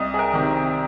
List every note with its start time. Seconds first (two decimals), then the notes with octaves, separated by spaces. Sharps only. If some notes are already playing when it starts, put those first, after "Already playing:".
Already playing: C2 D#5
0.14 G#4
0.19 A#4
0.33 C3 D#3